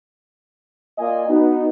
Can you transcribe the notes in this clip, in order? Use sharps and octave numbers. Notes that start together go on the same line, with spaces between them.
A#3 F4 D5 D#5 G#5
B3 D#4 F#4